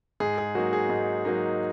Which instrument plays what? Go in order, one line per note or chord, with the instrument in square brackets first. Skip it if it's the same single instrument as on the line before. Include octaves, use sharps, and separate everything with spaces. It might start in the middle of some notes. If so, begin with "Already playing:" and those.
[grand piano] G#2 G#4
G#4
F#3 A#3 D#4 F#4
G#4
G#2
F#3 A#3 D#4